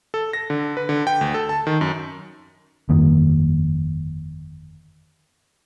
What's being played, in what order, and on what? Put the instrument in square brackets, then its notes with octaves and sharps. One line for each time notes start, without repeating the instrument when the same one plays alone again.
[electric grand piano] A4
A#6
D3
B4
D3
G5
D2
A4
A5
D#3
F#2
[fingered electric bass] G1 F2 D#3 A#3